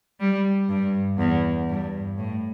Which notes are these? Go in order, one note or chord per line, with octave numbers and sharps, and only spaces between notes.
G3
G2
E2
G2
A2